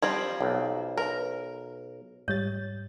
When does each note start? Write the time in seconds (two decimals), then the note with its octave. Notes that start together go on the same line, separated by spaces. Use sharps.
0.02 F3 G3 C4 D5
0.41 B1
0.97 A#4 B4
2.28 G#2 G3 C#5 A6